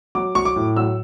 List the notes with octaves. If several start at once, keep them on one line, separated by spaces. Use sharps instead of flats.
F#3 D6
F#3 C#6
D6
A2
F#3 E6